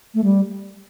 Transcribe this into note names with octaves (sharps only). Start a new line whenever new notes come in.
A3
G3